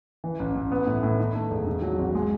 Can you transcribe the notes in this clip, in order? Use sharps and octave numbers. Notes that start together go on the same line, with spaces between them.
E3
A1
A1
B3
A2
A2
D#3
A3
E1
D#3
F#3
G#1
G#3